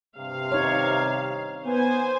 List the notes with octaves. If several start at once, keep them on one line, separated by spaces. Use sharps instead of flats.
G2 C3 F5
D#4 C#5
B3 C5 G#5